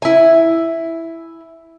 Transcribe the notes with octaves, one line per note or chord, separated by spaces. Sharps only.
E4 G#5